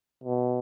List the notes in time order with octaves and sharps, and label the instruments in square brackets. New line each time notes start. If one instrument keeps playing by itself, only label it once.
[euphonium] B2